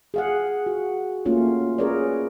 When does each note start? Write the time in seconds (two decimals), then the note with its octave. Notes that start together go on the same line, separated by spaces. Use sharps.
0.14 G#4 F5 F#5
0.66 F#4
1.26 A3 A#3 C#4 F4
1.78 C#4 G#4 A#4 B4 C#5 D5